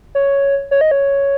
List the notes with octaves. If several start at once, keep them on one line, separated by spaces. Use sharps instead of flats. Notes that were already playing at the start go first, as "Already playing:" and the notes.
C#5
C#5
D#5
C#5